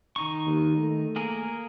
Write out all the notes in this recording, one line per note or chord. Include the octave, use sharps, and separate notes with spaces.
D#3 D#4 C#6
D#2
A3
A#3 G#4 A#4